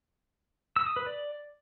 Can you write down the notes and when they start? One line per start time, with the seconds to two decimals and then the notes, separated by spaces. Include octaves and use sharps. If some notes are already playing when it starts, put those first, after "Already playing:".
0.76 E6
0.86 D#6
0.96 B4
1.06 D5